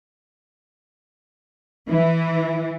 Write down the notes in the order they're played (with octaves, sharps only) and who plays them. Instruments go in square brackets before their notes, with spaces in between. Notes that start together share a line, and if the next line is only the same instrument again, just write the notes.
[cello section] E3